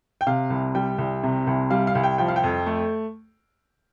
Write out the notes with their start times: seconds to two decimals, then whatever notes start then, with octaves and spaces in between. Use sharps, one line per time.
0.21 G5
0.27 C3 F5
0.50 C2
0.75 G3 G5
0.98 C2
1.23 C3
1.47 C2
1.70 G3 F5
1.87 F5
1.95 C2
2.03 G5
2.18 F3 G5
2.28 F5
2.36 G5
2.43 F2
2.66 A3